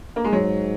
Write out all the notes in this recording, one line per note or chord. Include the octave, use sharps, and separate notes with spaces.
A#3
G#3
G#2 F#3